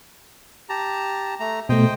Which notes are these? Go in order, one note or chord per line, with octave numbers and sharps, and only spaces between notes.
G4 A5 A#5
A3 A#5
B2 A3 C5 D#5 G5